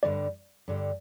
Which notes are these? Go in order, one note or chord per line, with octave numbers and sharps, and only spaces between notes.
G2 D3 G3 D5
G2 D3 G3